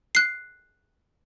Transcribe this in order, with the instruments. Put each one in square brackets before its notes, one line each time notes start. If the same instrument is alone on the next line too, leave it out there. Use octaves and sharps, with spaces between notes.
[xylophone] F#6 C7